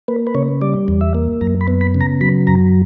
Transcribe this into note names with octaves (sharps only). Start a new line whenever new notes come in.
A#3 B4
B4
C#3 C#5
G3 D5
E2
E5
A#3
F#2 A#5
B5
B3
B5
C#3
A#5
F#3 B5
F#2 A#5